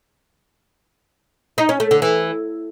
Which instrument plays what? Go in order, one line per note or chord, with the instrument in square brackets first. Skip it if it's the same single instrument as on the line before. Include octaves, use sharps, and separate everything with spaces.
[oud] D#4
C#4
A3
D3
E3